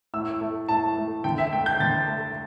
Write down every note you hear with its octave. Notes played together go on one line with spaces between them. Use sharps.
A2 E6
A3
A2 A5
A3
D3 G5
E5
A3 G5
G6
D3 A6
A3